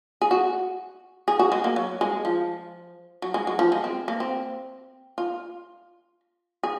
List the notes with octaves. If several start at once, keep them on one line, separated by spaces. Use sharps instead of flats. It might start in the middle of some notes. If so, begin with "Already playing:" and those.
G#4
F#4
G#4
F#4
G#3
A#3
F#3
G#3
F3
F#3
G#3
F#3
F3
G#3
C4
A#3
C4
F4
G#4